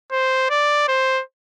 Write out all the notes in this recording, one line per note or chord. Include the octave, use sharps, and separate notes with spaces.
C5
D5
C5